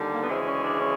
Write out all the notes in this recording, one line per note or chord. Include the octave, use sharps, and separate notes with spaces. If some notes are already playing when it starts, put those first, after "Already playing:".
Already playing: D#2 D3 G3
A#3
B3
D2 C#3 E3 G#3 C4
C#4
D4
C#4